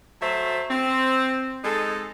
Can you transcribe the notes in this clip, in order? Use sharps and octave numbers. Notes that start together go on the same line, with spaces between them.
F#3 A3 C5 E5
C4
G#3 D#4 A4